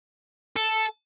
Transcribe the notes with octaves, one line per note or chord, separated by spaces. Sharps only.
A4